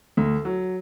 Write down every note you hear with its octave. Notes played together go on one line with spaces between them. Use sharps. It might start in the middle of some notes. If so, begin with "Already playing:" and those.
D2
F#3